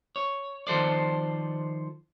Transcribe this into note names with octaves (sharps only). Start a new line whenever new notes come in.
C#5
D#3 F3 A4 C5 D5